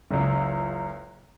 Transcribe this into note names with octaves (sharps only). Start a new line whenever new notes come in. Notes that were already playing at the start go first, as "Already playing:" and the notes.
F#1 C#2